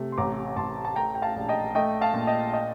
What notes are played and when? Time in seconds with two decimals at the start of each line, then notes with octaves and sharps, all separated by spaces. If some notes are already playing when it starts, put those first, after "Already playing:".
Already playing: C3 A3
0.12 C6
0.18 A1 A#5 D6
0.56 A1 A5 C6
0.85 A5
0.96 A3 G5 A#5
1.15 G5
1.22 F5 A5
1.36 A#1
1.49 D#5 G5
1.75 A3 D#5 G5
2.01 F5 A5
2.14 A#2
2.27 D#5 G5
2.53 D#5 G5